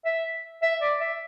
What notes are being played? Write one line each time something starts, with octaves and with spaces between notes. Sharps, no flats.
E5
E5
D5
E5